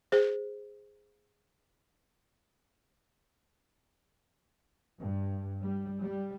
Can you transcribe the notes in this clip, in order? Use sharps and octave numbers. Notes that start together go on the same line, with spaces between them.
G#4 C5
G2
G3
G3